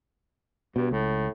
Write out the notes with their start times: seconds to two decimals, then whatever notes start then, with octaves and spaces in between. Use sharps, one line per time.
0.76 G2 B2
0.91 C#2 A2